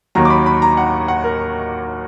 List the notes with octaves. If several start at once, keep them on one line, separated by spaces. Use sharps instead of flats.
D#2 D#3 F#3 A#5
D6
B5
B5
A#5
F#5
F#5
A#4